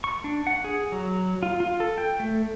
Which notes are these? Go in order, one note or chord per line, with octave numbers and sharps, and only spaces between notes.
C#6
D4
F#5
G#4
F#3
F4
F4
A4
G5
A3